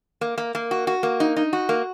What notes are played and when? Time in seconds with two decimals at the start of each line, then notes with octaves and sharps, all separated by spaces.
0.21 A#3
0.38 A#3
0.55 A#3
0.71 F#4
0.87 F#4
1.03 A#3
1.20 D#4
1.36 D#4
1.53 F#4
1.69 A#3